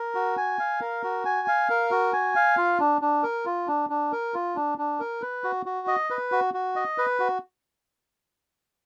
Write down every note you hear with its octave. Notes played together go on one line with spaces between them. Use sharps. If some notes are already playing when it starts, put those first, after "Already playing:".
Already playing: A#4
F#4
G#5
F5
A#4
F#4
G#5
F5
A#4
F#4
G#5
F5
F4
D4
D4
A#4
F4
D4
D4
A#4
F4
D4
D4
A#4
B4
F#4
F#4
D#5
B4
F#4
F#4
D#5
B4
F#4